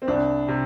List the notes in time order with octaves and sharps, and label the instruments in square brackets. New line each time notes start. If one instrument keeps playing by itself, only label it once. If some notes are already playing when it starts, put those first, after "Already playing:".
[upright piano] C4
[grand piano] C2 [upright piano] D4
[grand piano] C3